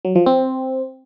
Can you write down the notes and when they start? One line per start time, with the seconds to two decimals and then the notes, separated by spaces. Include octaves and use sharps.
0.05 F#3
0.16 F3
0.26 C4